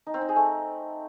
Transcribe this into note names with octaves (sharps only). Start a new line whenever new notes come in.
D#4
C4
D#4
G#4
A3